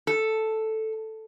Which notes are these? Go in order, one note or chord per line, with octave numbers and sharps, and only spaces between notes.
A4